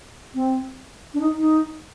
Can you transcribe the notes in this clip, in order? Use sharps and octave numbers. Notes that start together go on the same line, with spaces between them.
C4
D4
D#4
D#4